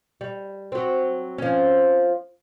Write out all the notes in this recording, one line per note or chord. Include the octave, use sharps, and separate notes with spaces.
G3
F#3 C4
F3 C#4